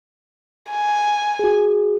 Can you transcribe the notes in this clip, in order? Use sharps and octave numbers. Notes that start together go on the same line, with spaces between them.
G#5
F#4 G#4